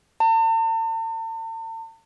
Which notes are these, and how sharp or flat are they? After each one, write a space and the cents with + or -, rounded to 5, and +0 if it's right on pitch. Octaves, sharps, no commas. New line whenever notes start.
A5 +45